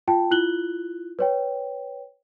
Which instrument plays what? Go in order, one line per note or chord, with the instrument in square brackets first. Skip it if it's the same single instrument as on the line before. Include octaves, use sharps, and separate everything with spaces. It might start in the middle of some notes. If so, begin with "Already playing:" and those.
[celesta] F4 G5 A5
E4 F4 F#6 F#7 G7
B4 C#5 G5